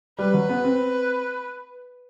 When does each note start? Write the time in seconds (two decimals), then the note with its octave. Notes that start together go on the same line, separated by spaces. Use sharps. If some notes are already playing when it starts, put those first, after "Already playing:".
0.19 G3 B4
0.34 F#3
0.49 B3
0.64 C4